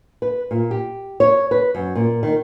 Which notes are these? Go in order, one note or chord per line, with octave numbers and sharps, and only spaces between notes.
B4
A#2
G4
C#5
B4
F#2
A#2
D#3